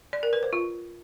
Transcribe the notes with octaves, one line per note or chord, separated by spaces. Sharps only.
D5
A#4
B4
C5
F4